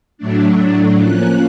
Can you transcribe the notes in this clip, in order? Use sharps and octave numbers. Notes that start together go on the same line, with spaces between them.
A2 F#3 A3 D4
F3 A#3 C#4 F#6